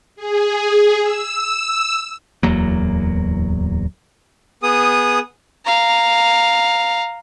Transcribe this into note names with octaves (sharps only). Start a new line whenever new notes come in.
G#4
E6
D1 E2 F#3 A#3
B3 G#4 D#6
F5 A#5